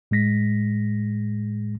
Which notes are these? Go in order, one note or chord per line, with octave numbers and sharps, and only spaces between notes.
A2 G#3 A#6 B6